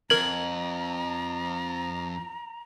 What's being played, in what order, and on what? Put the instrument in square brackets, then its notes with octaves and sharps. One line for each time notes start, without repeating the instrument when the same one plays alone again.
[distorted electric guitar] F2 [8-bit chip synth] A#4 G#6 [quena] A#5 [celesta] F#7